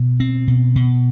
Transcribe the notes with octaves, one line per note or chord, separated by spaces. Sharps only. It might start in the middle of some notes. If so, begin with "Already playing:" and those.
Already playing: B2
C4
B2
B2